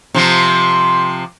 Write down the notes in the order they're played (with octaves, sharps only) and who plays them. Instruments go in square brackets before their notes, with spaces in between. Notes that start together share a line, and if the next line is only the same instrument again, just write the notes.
[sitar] C3 F3